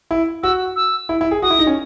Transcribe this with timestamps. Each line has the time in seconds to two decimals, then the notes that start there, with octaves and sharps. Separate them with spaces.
0.11 E4
0.43 F#4 E6
0.76 E6
1.09 E4
1.21 E4
1.31 G#4
1.42 F#4 D#6
1.50 E4
1.59 D#4
1.67 C#4